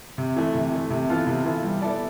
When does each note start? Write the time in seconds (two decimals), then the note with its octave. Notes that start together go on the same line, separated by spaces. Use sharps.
0.18 C3
0.36 E3 A3
0.54 C3
0.72 E3 A3
0.90 C3
1.09 E3 B3 F4 A4
1.27 C3
1.45 E3 B3 F4 A4
1.63 G3
1.82 B3 E4 A4 D5